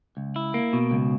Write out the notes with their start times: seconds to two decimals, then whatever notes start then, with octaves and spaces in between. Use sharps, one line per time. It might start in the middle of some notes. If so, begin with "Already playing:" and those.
0.17 C#2
0.36 E4
0.54 A#3
0.73 B2
0.91 C#2